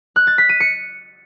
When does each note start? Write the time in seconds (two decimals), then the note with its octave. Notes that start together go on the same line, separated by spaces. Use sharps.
0.16 F#6
0.27 A6
0.38 B6
0.49 D#7
0.60 C#7